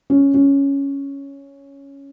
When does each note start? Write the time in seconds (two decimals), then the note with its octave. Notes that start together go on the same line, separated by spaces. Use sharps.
0.10 C#4
0.34 C#4